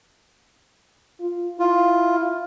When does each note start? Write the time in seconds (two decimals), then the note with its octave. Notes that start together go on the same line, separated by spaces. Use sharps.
1.20 F4
1.60 E4 F4